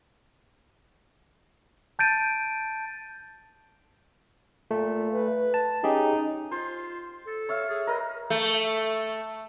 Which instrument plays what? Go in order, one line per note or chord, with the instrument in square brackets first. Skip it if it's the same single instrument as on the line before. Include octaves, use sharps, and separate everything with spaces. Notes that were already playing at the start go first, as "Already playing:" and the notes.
[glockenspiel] A5 G6 A6 D7 D#7
[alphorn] A#2 [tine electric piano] A3
[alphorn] B4
[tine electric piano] A5
[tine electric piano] C#4 G4 G#4 [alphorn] D#4
[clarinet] F4 [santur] C5
[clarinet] A4
[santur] C#5 E5 F5
[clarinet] G#4
[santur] A#4 B4 [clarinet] D#5
[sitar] A3